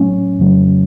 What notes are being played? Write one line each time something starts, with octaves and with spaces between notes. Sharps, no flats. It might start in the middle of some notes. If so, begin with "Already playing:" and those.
Already playing: A2 F#3 A3 C#4
F2 C#3 F#3 A3